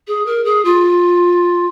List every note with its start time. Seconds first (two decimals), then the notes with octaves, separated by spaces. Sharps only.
0.07 G#4
0.26 A#4
0.45 G#4
0.65 F4